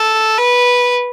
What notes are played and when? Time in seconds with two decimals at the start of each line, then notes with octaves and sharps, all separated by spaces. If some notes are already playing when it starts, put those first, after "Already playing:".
Already playing: A4
0.38 B4